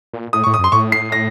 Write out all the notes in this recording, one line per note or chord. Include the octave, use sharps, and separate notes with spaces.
A#2
A2 D#6
A2 C#6
D#6
F#2
C6
A2 C#6
C7
A#6